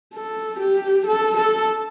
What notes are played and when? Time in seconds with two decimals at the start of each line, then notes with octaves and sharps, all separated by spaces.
0.14 A4
0.60 G4
1.07 A4
1.37 A4